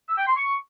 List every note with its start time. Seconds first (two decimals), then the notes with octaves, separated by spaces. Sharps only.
0.09 E6
0.18 G5
0.27 C6
0.36 C#6